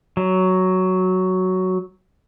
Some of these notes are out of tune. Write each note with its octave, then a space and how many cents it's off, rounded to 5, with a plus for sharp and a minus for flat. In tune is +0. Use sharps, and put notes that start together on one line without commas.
F#3 +5